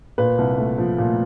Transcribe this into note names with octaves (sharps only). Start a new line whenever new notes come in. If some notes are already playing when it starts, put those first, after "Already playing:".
A#2 B4
C2
A3
F3
A#2